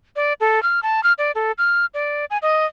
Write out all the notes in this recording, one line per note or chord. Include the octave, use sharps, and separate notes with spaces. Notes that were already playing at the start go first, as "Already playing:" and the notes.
D5
A4
F6
A5
F6
D5
A4
F6
D5
G#5
D#5